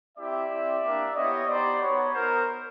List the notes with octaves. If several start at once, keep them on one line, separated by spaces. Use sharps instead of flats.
C4 E4 G4 D5 E5
C4 E4 G4
A#3 D4 G4
B3 E4 G4 C#5 D#5
B3 D#4 G4 C5 D5
B3 D#4 F#4 B4 C#5
B3 D#4 F#4 A#4 C5